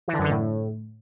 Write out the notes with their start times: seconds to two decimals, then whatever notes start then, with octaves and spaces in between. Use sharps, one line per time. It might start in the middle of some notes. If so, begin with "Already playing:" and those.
0.08 E3
0.13 D3
0.19 F#2
0.24 D3
0.30 A2